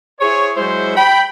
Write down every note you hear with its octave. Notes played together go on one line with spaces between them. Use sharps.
E4 G#4 C5 C#5
F#3 G#3 E4 C5
G5 B5